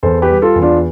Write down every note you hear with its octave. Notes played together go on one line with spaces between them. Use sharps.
E2 A4 C5
G4 B4
G3
F4 A4
E2
D4 F4